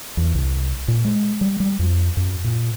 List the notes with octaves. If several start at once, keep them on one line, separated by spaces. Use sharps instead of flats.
E2
C2
A#2
G#3
G3
G3
F2
F#2
A#2